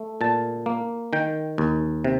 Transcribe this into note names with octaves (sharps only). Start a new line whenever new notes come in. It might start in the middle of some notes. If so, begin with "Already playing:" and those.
Already playing: A3
A#2 A5
A#3
D#3 G5
D#2
C3